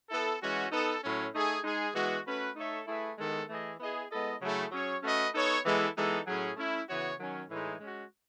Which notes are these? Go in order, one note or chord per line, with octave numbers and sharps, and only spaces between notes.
B3 E4 A4
E3 G#3 C#4 F#4
B3 D#4 A4
A2 F#3 C#4
A3 D#4 G#4
G#3 D#4 G#4
E3 G#3 B3 F#4
A3 C#4 F#4 B4
A3 D#4 A4 C#5 E5
A3 E4 G#4 B4 E5
D#3 G#3 B3 E4 A4
E3 A3 E4 G#4 D#5
B3 E4 G#4 D#5
G#3 B3 E4 A4 D#5
C#3 F#3 A3 E4 G#4
F#3 C#4 G#4 C#5
A3 C#4 F#4 B4 D#5
B3 D#4 A4 C#5
E3 G#3 B3 E4 A4
E3 G#3 B3 D#4 A4
A2 F#3 C#4 G#4
A3 C#4 E4
C#3 E3 B3 F#4 C#5
D#3 F#3 C#4
A2 E3 G#3 D#4
G#3 C#4 F#4